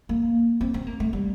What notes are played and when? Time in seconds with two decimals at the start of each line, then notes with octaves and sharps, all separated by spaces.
0.09 A#3
0.61 C4
0.74 C4
0.87 A#3
1.00 A3
1.13 G3